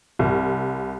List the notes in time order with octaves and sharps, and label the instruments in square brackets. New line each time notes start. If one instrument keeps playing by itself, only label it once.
[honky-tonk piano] C2